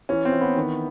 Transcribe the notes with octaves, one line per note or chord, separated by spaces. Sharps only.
E3 C#4
C4
E3
B3
D#3